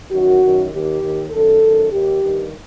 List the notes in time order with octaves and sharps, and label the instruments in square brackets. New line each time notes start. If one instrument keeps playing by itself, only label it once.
[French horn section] F#2 D#3 F#4
F#2 D#3
D#2 D#3 G4
D#2 D#3
F#2 D#3 A4
F#2 D#3
D#2 D#3 G4
G2 D#3